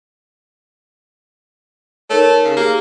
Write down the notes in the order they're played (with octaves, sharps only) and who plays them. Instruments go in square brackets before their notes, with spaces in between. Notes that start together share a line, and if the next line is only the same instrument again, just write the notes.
[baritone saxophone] A3 [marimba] D#4 A#4 C#5
[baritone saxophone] C#3
[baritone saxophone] A#3 [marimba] G4 G#4